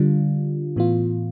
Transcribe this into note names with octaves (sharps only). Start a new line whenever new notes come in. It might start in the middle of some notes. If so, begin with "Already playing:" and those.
Already playing: D3 G3 D4 F4
A2 E3 B3 F4